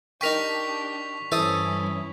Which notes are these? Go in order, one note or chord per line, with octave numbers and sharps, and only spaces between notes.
D4 D#4 G4 A#4 G5 C#6 B6 F7
G2 E3 C#4 E4 A4 C5 E5 D#6